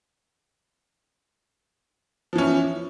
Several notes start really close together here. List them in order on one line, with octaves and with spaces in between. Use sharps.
F3 E3 C#4 E4